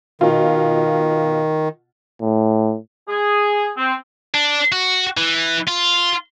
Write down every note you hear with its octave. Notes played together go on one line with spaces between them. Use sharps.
B2 D#3 F4
A2
G#4
C4
D4
F#4
E3
F4